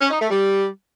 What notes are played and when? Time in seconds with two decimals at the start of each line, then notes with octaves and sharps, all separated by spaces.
0.01 C#4
0.11 D#4
0.21 A3
0.31 G3